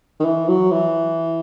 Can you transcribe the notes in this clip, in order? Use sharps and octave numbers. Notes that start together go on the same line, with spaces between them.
D#3
E3
F#3
E3